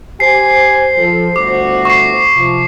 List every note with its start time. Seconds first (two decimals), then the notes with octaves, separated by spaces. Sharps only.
0.20 G4 C5 G#5 C7
0.97 F3 A4
1.36 G1 A3 F#4 D6
1.85 C#6 C7
2.35 C3 F3